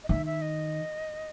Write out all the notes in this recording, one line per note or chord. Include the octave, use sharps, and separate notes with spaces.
D#5
D#3 E5
E5
D#5